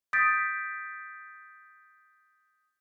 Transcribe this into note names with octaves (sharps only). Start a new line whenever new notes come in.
D#6 G6 A6 B6 D7